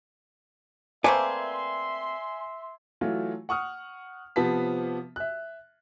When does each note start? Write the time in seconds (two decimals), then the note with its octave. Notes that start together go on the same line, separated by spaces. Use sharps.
1.04 A3 A#3 C4 B4 D5 E5 G#5 C6
3.01 E3 F#3 A3 F4
3.49 F#5 C#6 D#6 F6
4.36 C3 F3 B3 A5 B6
5.16 E5 F#6